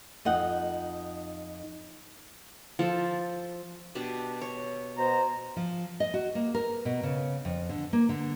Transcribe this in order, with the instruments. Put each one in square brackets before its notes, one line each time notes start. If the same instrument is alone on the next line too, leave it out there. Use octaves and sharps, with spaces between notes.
[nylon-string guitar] F2 D#4 F#5
[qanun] F3 A4
B2 D4 G4
C#5
[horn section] B2 C5 A#5
[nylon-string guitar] F3
D#5
F#4
A#3
A#4
B2
C#3
F2
D3
A#3
D3